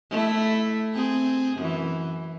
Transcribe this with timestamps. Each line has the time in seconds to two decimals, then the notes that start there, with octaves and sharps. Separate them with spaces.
0.10 A3 E4
0.94 C4 G#4
1.57 F#2 E3